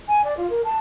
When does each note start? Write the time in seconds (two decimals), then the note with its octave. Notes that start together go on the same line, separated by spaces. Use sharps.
0.08 G#5
0.24 D5
0.37 F4
0.50 A#4
0.65 A5